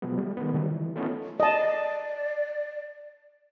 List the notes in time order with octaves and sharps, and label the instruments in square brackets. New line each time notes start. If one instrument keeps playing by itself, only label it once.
[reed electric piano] B2 F3 F#3 G#3 B3
G3 A3
D#3 G#3 B3
D3 D#3 F3 G3 A3 C4
E3
A3 B3 C#4 D#4 F4 A4
[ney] D5 [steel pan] D#5 A5